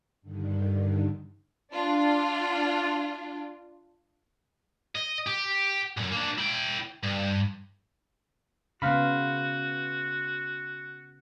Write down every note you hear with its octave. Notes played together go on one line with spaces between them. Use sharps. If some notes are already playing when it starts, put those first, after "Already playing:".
G2 D3 D#3
D4 F4
D#5
G4
B1 F#2
A#3 D4
E4 G5
G2
C#3 B3 F#4 C5 F5 B5